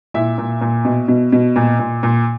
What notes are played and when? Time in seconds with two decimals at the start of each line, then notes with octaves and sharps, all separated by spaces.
0.14 A#2 E4 E5
0.38 A#2
0.61 A#2
0.85 B2
1.08 B2
1.32 B2
1.56 A#2
1.79 A#2
2.03 A#2